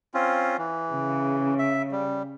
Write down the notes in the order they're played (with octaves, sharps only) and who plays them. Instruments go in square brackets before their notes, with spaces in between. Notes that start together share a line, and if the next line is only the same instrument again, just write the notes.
[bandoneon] C4 C#4 F4
E3
[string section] C#3
[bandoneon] E5
G3